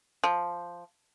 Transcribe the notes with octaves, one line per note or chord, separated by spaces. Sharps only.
F3